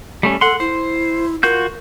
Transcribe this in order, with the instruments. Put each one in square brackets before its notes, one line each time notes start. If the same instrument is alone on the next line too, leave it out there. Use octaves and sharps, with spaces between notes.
[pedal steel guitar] G3 A3 C#4
[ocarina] A4 [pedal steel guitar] F#5 C6
[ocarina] E4 [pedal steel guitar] C5
[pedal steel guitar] F4 F#4 G6 [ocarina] A#4